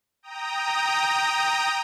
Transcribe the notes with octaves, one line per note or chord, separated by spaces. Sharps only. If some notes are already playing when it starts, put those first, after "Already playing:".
G5 A#5 D#6